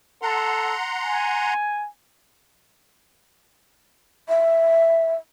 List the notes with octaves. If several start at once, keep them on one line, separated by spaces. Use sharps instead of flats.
A4 F#5 A#5 C6
G#5
E5